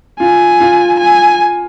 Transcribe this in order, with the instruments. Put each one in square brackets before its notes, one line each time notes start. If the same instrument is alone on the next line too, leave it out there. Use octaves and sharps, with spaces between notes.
[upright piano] F4 [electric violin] G#5
[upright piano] F4
[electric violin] G#5